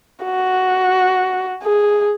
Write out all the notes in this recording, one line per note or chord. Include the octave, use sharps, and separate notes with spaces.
F#4
G#4